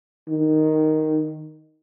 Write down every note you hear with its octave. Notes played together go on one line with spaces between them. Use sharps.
D#3